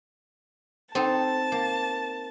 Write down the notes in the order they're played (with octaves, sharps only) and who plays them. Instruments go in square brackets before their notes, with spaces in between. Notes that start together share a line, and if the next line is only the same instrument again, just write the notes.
[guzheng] C4 D#4 A4 [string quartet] A5
[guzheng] A#3